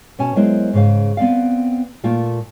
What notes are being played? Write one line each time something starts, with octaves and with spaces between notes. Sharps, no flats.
B2 C#4 G#5 A5
F#3 G#3 B3 E4 A#4 C5
G#2 C#3 F5
B3 C4 D5 F5
A#2 A3 A#3 F4